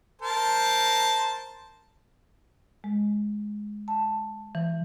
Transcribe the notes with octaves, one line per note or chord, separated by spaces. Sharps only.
A#4 C5 A5
G#3
A5
E3